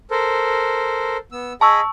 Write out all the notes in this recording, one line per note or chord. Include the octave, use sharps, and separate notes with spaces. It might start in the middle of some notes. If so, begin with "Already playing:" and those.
A4 A#4 C5
B3 E6
G#4 D#5 A5 B5 C#6 E6